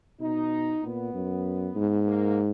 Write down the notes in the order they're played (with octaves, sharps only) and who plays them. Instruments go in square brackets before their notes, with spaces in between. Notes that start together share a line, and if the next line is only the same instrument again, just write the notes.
[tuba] B2 [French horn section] D#4
[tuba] A#2 [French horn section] B3
[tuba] F#2
G#2
[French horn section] A#3